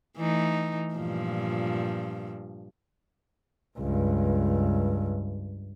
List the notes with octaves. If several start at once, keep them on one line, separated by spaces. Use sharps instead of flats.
E3 A3 D#4
G2 A#2 F3
C#2 G2